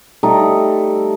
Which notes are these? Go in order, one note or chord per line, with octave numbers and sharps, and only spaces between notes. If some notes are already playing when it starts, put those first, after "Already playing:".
G3 A3 D#4